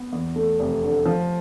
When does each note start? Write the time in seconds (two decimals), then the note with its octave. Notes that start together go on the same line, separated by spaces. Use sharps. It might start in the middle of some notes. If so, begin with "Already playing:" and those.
Already playing: B3
0.13 E2
0.36 A3
0.59 F1
0.83 D3
1.05 F3